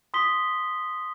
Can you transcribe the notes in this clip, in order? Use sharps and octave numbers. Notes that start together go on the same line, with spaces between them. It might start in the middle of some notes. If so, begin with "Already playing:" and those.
C6 D#6 B6 G7